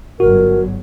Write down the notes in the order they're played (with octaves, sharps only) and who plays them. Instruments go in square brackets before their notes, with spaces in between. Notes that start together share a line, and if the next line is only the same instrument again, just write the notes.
[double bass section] G1 F#3 [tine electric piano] F#4 [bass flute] A#4